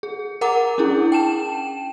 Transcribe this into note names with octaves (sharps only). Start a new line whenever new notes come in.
G#4
A#4 F#5 A#5 D6
C#4 D4 E4 G#4
G5 A5 E7